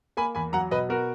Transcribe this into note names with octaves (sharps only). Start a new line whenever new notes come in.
A#3 G#5 B5
E2 G#5 B5
F#3 F#5 A#5
B2 B4 D#5
B3 F#4 A#4